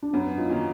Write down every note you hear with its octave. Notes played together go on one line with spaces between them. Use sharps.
D4
F#2 B3 C#4
D#4 F4
D#3 F#3 A#3 C#4